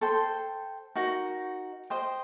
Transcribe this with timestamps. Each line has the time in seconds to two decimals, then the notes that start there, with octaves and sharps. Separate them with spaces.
0.01 A4 C5 G5 C6
0.96 D#4 F#4 A#4
1.90 C5 D#5 G5